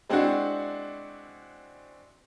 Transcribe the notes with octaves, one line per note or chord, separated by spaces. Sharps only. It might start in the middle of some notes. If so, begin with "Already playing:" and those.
G#3 C4 D4 E4 F#4 F#5